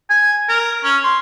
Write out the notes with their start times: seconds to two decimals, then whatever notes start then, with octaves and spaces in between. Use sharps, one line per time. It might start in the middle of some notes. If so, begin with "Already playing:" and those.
0.10 G#5
0.49 A#4
0.84 C#4
1.04 C6